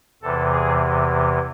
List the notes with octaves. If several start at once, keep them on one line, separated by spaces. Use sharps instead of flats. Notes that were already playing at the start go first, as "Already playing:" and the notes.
E2 C3 E3 A4
G#4